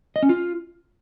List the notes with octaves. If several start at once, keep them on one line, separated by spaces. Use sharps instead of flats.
D#5
C#4
F4